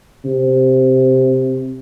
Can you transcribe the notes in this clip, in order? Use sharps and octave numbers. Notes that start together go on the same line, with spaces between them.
C3